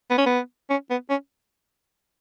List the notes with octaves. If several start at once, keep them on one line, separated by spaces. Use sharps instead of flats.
B3
C#4
B3
C#4
B3
C#4